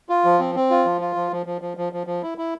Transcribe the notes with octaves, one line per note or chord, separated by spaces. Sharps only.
F4
F3
C4
C4
F4
F3
F4
F3
F3
F3
F3
F3
F3
F3
E4
E4